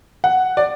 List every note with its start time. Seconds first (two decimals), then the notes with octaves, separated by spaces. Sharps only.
0.24 F#5
0.57 D5